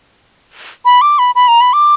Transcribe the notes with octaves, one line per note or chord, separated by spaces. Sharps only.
B5
D6
B5
B5
A#5
B5
D6